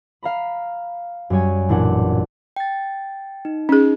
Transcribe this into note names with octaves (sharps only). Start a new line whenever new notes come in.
F5 A#5 B5
F#2 G3 C#5 G#5
A1 A#2 D4 F#5
G5 A6
D#4
C#4 D#4 G#4